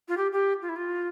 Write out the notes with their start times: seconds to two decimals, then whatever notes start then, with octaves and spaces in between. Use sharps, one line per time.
0.08 F4
0.17 G4
0.32 G4
0.62 F4
0.69 E4
0.76 F4